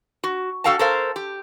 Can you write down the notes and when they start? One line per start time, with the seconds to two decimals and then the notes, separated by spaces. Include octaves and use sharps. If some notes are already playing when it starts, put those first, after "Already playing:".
0.24 F#4
0.64 D4 F#4 A4 F5 G5 A5
0.79 A4 A#4 C5 F5
1.16 G4